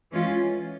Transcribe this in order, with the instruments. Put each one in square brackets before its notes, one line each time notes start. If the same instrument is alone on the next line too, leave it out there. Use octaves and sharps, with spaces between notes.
[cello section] E3 G#3 C#4 F4